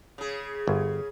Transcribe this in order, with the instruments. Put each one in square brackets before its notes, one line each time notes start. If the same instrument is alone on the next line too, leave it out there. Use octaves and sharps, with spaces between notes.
[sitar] C#3 G#4
[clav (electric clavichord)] G1